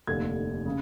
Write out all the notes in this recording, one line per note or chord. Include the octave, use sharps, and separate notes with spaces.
F1 D#2 D3 G#6
C#3